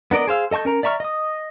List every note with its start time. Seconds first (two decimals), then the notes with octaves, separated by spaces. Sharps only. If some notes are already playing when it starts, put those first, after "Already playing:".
0.11 B3 D4 A#4 D5 D#5
0.27 G#4 C5 F5 E6
0.51 A4 D#5 A5 C#6 G6
0.65 C#4 A#4 A#5
0.83 D5 E5 A#5 C#6 F6
1.00 D#5 D#6